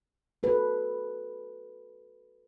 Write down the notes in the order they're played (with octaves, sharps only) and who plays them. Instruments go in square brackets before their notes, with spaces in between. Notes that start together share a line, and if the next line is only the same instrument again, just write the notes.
[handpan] F#4 A4 B4